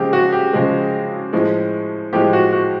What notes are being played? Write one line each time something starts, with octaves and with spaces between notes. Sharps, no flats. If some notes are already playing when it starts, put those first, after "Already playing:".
Already playing: C#3 F3 G#3 G4
F#4
G4
C#3 F3 G#3
A2 F3 G#3
A2 F3 G#3 G4
F#4
F#4